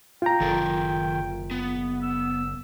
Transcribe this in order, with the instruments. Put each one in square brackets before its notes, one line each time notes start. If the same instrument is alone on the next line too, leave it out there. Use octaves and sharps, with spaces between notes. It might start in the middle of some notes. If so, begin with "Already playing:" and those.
[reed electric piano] F4 A#5 [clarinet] G5
[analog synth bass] F#1 [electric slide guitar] D#3 A4 A#4
[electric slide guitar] B3
[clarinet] E6